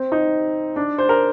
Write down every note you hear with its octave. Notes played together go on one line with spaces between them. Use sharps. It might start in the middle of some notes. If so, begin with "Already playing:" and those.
Already playing: C4
D#4
D4
C5
A#4